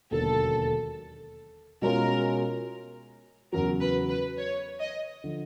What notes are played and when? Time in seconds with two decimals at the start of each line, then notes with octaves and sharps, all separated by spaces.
0.11 E1 D#2 D3 F#3 A#3 A4
1.82 B2 G#3 C#4 F4 A#4
3.52 E2 C#3 F#3 A#4
3.81 B4
4.09 B4
4.38 C#5
4.80 D#5
5.24 D3 F3